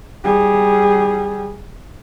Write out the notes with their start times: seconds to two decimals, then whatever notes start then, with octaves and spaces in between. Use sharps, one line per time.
0.24 G3 G#4